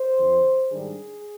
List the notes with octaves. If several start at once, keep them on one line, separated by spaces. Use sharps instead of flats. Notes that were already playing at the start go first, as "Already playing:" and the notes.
Already playing: C5
F2 D3 F3
G#2 D#3 G3 D4 G#4